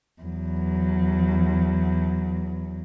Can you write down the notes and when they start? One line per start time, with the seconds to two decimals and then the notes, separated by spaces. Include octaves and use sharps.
0.22 E2 F#3